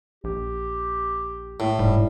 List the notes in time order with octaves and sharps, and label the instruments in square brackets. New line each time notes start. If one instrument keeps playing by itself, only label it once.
[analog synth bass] A#1 [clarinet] G4
[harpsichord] A2
[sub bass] E1 [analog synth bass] G#2 [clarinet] G3